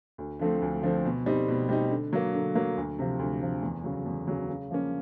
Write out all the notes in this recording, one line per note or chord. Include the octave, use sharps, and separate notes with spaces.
D2
D3 F3 A3 C4
D2
D3 F3 A3 C4
B2
G3 C4 D#4
B2
G3 C4 D#4
D3
F#3 A#3
D3
F#3 A#3
D2
C3 F3
D2
C3 F3
E2
C#3 F#3
E2
C#3 F#3
C#3
F3 A#3 C#4